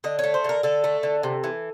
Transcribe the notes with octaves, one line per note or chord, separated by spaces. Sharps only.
D3 D#5
A3 C#5
C5
D3 A#4
D3 A4
A3
D3
C3
E3